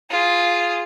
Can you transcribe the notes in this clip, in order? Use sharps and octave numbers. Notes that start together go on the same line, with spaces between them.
F4 G#4